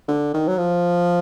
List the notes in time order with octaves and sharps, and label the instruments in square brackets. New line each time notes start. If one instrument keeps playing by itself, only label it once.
[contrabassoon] D3
D#3
F#3
F3